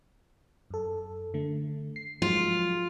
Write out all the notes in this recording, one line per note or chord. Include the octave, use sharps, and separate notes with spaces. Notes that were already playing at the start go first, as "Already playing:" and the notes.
F#2 A4
D3 A3
C7
F3 F#3 G#3 F4